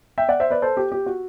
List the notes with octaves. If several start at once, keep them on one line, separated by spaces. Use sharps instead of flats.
E5 G5
D5 F#5
C5 E5
B4 D5
A4 C5
G4
G4
F#4